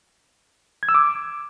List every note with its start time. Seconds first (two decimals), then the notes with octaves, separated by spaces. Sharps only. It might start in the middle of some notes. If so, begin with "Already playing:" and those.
0.83 G#6
0.89 E6
0.94 D6